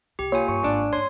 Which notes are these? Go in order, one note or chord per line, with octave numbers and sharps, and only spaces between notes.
C2 G4
A#3 F4 C#5 G#5
G2 C#6
G#1 D4
G2 C#4 C#5 C6